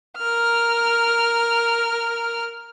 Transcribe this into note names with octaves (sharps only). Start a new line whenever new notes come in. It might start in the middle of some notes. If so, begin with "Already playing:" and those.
A#4 F6